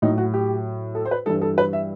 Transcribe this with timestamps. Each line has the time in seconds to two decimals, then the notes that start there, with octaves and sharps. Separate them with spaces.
0.02 A2 F#3 D#4
0.18 F#4
0.34 G4
0.95 A4
1.05 C5
1.11 B4
1.26 G2 E3 G3 A4
1.41 A4
1.58 B4
1.73 E5